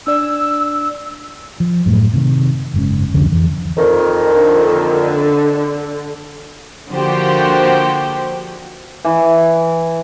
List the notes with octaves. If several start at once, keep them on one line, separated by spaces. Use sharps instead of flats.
D4 D5 E6
F3
F#2 A2
C3 D#3
F#1 G#2 C#4
C2 F2 D3 C#4
F2 E3
F2 A#2 D#3
D3
D3 F3 A#3 F#4 G4 C5
E3